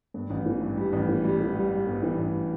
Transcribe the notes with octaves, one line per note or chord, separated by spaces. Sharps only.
G2
A1
E3
G2
G3
A1
E3
G3
E3
G3
G3
G2
E3
A1